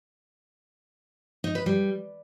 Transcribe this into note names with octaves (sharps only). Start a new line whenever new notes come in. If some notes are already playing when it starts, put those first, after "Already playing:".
D#4
B4
G3